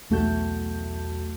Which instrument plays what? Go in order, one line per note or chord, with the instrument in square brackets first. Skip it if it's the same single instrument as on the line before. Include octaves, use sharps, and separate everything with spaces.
[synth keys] B1 E2 A3 F#4 A5 G6